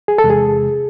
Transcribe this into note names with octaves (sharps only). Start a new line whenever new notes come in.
G#4
A4
E2 C3 G#3
G#4